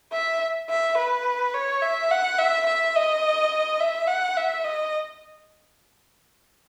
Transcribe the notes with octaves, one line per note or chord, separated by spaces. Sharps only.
E5
E5
B4
C#5
E5
F#5
E5
E5
D#5
E5
F#5
E5
D#5